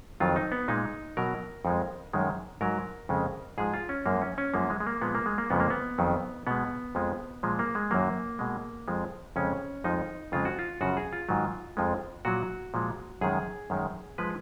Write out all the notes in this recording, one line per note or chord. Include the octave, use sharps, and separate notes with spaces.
F2 D#3 F#3 F4
D#4
B3
A#2 G#3 D#4
B2 F#3 A#4
F2 F3 G#3
F#2 D#3 G#3
G#2 F#3 A#4
F2 C#3 G#3
G#2 F3 G#3 G#4
F4
C#4
F#2 F3 G#3 A#3
C#4
C#4
F#2 F3 G#3 A#3
G#3
G#3
A#3
A#2 F3 G#3 B3
A#3
G#3
A#3
F2 C#3 F3 G#3 B3
A#3
B3
F2 D#3 F#3
B2 G#3 B3
F2 F3 G#3
A#2 F3 G#3
A#3
G#3
F#2 D#3 F#3 A#3
B2 G#3
F2 F3 G#3
F2 C#3 G#3 C#4
F2 F3 G#3 D#4
F2 C#3 G#3 F4
F#4
F4
F#2 C#3 F3 F#4
G#4
F4
G#2 D#3 F#3
F2 F3 G#3
A#2 F#3 F#4
A#2 F3 G#3
F#2 D#3 G#3 G#4
F#2 D#3 G#3
F3 G#3 B4